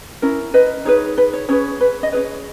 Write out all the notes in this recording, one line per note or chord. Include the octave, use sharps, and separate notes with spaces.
C#4 E4 A#4
B4 D#5
D#4 G#4 B4 C#5
B4
C#5
C#4 G#4 B4 C#5
B4
D#5
C#4 G#4 B4 C#5